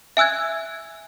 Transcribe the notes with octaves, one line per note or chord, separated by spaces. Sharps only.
E5 G#5 E6 F#6 G#6